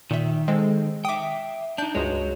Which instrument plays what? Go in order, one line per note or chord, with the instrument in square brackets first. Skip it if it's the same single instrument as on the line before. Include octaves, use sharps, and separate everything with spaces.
[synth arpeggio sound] A#2 E5 [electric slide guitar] D#3
[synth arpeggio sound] G#3 C4 A4
[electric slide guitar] E5 G5 [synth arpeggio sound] D6 D#6
[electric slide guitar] D4 D#4 [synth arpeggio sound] G6
[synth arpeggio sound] C#2 G2 G#3 [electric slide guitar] F#4 C#5